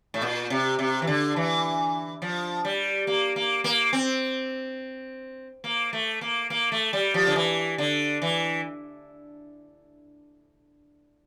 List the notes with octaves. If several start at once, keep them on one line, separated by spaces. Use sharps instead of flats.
A2
A#2
C3
C3
E3
D3
E3
F3
G3
A#3
A#3
A#3
C4
A#3
A3
A#3
A#3
A3
G3
F3
D3
E3
D3
E3